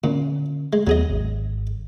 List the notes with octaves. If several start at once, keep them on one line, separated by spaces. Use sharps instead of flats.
A#2 D3 C#4
G#3
D#2 F#3 B3 G#4 D#5
G#1